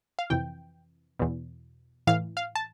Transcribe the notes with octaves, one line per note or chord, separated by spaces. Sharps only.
F5
F2 C3 E3 G5
E2 B2
A2 E3 F5
F5
A5